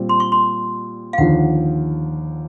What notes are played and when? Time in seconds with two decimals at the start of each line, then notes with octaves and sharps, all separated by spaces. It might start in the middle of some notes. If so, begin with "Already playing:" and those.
Already playing: A#2 G3 C4
0.09 C6
0.20 C#6
0.32 C6
1.13 F5
1.18 D#2 D3 F3 F#5